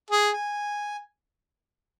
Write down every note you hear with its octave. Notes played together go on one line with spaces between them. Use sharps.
G#4
G#5